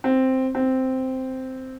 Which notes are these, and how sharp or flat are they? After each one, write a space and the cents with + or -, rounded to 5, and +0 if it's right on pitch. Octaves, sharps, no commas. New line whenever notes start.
C4 +0
C4 -5